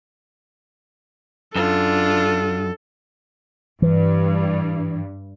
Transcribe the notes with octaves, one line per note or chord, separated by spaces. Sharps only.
F#2 D4 F4 A4
G2 E3